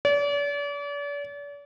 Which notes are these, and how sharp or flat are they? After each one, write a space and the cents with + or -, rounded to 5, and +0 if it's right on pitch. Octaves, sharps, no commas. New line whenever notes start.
D5 -40